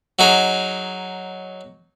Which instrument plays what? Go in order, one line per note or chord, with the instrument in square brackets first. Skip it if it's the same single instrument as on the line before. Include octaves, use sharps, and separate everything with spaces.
[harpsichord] F#3 D#4 G#4